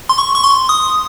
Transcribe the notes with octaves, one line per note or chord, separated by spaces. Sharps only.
C6
C#6
C#6
C6
D#6